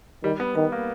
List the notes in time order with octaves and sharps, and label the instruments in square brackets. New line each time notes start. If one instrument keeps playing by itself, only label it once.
[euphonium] D#3 [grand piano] G3
[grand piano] B3
[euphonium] D#3 [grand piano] B3
[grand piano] A#3